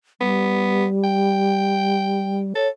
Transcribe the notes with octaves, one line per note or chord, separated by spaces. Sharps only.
G3 B3
G5
A4 C#5